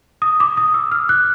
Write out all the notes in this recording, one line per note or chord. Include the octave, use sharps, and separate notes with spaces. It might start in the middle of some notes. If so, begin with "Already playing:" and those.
D#6
D6
D#6
E6
F6
F#6